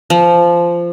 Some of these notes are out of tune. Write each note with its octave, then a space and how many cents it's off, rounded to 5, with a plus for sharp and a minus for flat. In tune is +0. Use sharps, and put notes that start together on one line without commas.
F3 -15